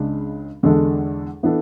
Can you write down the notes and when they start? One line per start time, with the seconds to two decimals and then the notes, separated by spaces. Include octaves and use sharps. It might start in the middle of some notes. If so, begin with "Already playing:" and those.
Already playing: C#2 C#3 G#3 D4
0.63 E2 D3 G#3 D4 A4
1.43 E3 B3 D4 A4